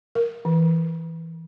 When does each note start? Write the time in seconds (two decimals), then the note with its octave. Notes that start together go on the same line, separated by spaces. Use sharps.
0.15 A#4
0.45 E3